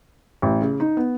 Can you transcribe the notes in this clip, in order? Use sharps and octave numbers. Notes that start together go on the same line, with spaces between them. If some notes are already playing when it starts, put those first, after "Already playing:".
A1
C#3
D#4
B3